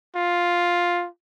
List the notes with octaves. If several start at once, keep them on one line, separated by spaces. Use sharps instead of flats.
F4